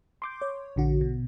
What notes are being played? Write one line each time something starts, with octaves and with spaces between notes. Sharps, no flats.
C6 D6 G6
C#5
A#1 D3 F#4
B2